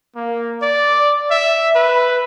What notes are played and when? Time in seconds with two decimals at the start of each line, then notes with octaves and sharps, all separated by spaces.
0.16 A#3
0.62 D5
1.31 E5
1.76 B4